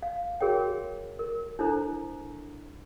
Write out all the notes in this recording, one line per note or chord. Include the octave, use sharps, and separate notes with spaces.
F5
F#4 G#4 A#4 C#5 G5
A#4
D4 E4 A4 C5 A#5